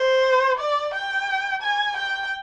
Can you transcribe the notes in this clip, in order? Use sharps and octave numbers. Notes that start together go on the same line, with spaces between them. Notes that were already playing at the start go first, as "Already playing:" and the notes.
Already playing: C5
D5
G5
G#5
G5